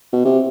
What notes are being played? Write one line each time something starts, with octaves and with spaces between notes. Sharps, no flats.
B2
C3